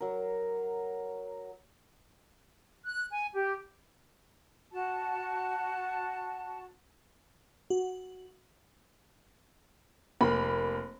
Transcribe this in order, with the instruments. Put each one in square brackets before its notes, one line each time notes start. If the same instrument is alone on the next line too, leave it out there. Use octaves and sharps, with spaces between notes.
[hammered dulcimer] F#3 A#4
[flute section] F#6
G#5
G4
F#4 A5
[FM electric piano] F#4
[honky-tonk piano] F1 A#3 B5